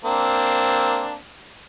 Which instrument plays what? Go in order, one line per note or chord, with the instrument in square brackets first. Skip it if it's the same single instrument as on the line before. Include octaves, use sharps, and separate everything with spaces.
[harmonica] A#3 C4 D4